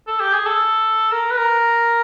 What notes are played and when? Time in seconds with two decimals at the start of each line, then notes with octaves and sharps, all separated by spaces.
0.07 A4
0.20 G4
0.33 G#4
0.46 A4
1.12 A#4
1.31 B4
1.37 A#4